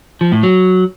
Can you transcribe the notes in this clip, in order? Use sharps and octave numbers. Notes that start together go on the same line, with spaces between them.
F3
A2
F#3